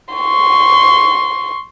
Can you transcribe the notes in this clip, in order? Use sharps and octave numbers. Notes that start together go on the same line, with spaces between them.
C6 C#6